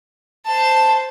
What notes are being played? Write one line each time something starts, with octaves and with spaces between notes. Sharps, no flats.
C5 A5